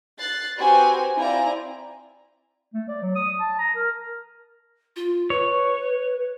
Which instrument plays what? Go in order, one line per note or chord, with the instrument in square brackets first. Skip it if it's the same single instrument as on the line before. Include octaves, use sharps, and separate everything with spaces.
[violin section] F#6 A6 C7
C4 F#4 G4 B4 G#5
C4 E4 F4 D5 G#5 A#5
[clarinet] A3
D5
F#3
D#6
A5
A#5
A#4
[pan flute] F4
[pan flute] B4 [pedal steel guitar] C#5